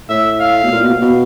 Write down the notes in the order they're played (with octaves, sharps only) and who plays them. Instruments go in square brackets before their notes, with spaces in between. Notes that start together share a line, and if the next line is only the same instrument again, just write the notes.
[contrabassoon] A2 [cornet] E5
[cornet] F5
[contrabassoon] B2
A#2
B2
B2